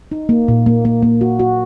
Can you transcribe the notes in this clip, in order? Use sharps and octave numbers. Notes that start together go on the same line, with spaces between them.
D#4
A#3
A#2
A#3
A#3
A#3
F#4
F#4